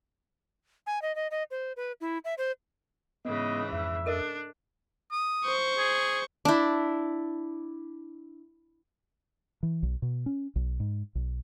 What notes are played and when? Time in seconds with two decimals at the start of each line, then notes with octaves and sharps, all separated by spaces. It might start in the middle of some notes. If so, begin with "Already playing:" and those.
0.86 G#5
1.02 D#5
1.15 D#5
1.31 D#5
1.51 C5
1.77 B4
2.01 E4
2.25 E5
2.38 C5
3.25 G#2 C#3 E3 B3 D#5
3.72 F2 E5
4.06 D4 A4 A#4 D#5
5.11 D#6
5.45 C5 C#6
5.78 G#4
6.45 D4 E4
9.63 E3
9.83 B1
10.02 B2
10.26 C#4
10.56 B1
10.80 G#2
11.15 B1